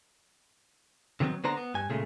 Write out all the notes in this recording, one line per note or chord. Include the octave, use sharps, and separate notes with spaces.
D3 D#3 F#3 B3 C4
D3 B3 D4 C5 A#5
B3
G2 G#5
A#2 C#3 G#3 A3